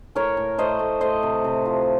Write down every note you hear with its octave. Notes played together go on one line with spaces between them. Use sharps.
A2 A#4 C#5
A2
A3 C5 D#5
A3
A3 C5 D#5
C3
C3
F3